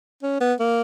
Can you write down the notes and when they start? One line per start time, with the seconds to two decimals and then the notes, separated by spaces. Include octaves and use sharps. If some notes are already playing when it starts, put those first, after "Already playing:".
0.23 C#4
0.41 B3
0.60 A#3